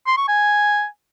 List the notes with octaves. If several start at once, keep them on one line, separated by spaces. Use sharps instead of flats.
C6
C#6
G#5